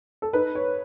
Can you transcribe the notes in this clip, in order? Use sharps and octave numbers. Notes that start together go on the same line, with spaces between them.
A4
D#4 B4
C#5